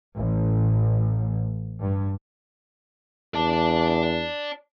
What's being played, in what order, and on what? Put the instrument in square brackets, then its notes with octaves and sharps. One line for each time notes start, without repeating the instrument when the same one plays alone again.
[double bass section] A1
G2
[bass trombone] E2 [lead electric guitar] D5 A5